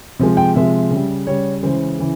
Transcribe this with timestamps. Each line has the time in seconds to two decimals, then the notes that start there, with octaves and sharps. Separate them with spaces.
0.19 C3 F3 G#3
0.37 G5
0.55 C3 F3 G#3 E5
0.91 C#3 G3
1.27 C#3 G3 C#5
1.63 C#3 E3 G#3 C5
1.99 C#3 E3